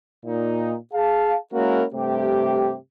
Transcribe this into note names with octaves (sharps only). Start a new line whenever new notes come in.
A#2 D#4
G#4 F5 A5
G#3 A#3 C#4 E4 F#4 A#4
G2 C3 A3 G4